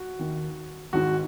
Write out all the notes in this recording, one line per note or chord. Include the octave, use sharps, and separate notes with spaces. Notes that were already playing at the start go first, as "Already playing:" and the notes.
Already playing: F#4
D#2 D#3
G#1 G#2 D#3 F#4